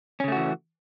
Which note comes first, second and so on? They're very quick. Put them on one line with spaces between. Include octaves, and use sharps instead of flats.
C#4 C#3 A3 F#4 E3